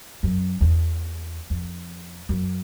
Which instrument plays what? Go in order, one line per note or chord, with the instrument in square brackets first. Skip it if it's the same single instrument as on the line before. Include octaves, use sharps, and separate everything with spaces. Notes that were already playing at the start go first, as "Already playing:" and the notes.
[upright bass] F#2
E2
F2
F#2